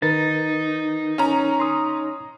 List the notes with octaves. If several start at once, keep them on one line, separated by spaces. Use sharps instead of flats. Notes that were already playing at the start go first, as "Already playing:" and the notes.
D#3 D#4 A#4 B4 A6
C#4 A#5
C6 D#6